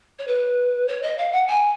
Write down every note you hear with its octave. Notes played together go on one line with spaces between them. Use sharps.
C#5
B4
C#5
D#5
F5
F#5
G#5